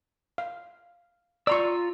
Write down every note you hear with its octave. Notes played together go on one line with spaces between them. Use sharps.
F5
F4 D5 A#5 C6 C#6 E6